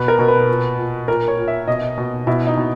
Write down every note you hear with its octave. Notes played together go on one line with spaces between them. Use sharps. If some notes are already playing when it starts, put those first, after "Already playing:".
Already playing: B2 B4
A#4
B2
B4
A#2
A#2
A#2 A#4
C#5
A#2
E5
B2 D#5
B2
B2 E4
D#4
B2